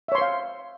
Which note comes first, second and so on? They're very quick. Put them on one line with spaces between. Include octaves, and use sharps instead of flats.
E5 C#5 C6 C5 F5